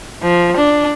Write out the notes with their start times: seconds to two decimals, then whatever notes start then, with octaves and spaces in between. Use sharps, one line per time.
0.23 F3
0.57 D4